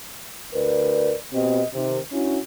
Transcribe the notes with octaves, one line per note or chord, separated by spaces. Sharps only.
D2 A#4 B4 D5
B2 C4 G4 D#5
C3 D#3
C#4 D4 E4 F#4